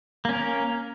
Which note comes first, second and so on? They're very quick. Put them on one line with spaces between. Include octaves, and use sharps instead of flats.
A#3 C#4 A#4